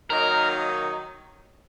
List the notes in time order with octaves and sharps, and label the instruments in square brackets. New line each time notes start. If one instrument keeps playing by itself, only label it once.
[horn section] D#3 F#3 A#3 D#4 [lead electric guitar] A#4